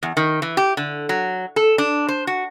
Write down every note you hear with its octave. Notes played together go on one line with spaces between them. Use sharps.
E2
D#3
E3
G4
D3
F#3
A4
D4
C5
F#4